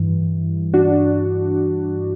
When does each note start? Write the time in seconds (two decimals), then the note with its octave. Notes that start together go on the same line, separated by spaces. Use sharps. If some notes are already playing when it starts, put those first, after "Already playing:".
Already playing: G2 E3
0.74 D4 F#4